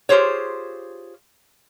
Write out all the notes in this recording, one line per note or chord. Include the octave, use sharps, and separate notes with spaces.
F4 G4 G#4 C5 C#5